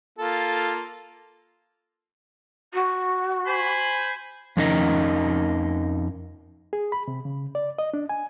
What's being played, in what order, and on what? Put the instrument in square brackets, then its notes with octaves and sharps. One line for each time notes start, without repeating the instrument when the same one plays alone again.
[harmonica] A#3 F4 A4
[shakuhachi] F#4
[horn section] C5 G#5 B5
[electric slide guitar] F2 F3 C#4 D#4 A#4 D#5
[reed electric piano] G#4
B5
C3
C#3
D5
D#5
D4
G#5